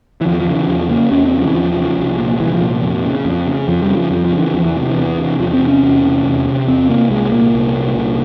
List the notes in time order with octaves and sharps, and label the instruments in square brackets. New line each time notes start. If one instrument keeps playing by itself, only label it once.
[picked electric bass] E3
E2 F3
F3
C#3
E3
E2 F3
C#3 A#3
E2 C#4
C4
C#3
F3
E3
E2 F3
C#3
C2
A#2
C2 E3
F3
A#2
F2
C#3
F2
C#3
F2 F3
G3
C#3
F3
F2 F3
F3
C#3
E3
E2 F3
E3
C3
E3
E2
C3
E2 F3
C4
C3
C#4
E2
C3
E2
C3
E2 C4
C3 A#3
C2 G#3
A#2 A#3
C2
A#2
C2